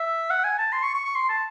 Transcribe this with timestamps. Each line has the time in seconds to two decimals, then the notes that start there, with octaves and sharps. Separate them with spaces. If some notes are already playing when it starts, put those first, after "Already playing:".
Already playing: E5
0.31 F#5
0.44 G#5
0.59 A5
0.73 C6
0.83 C#6
0.94 C#6
1.05 C#6
1.15 C6
1.29 A5